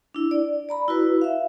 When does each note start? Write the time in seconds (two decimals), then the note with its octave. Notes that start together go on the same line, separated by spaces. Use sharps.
0.15 D4 E4
0.31 D5
0.69 D5 A#5 B5
0.88 E4 F#4 B4
1.22 E5 F5